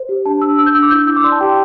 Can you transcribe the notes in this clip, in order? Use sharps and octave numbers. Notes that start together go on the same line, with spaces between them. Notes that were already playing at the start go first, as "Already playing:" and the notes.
Already playing: C5
G4
D4 A5
D4 E6
D4 E6
G6
D4 E6
D6
E4 G6
E4 E6
D6
D5 C6
A5
G4 G5